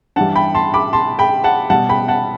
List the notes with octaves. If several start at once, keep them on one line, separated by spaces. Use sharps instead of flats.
G2 E3 G3 F#5 A5
G5 B5
A5 C6
B5 D6
A5 C6
G5 B5
F#5 A5
B2 G3 F#5 A5
G5 B5
F#5 A5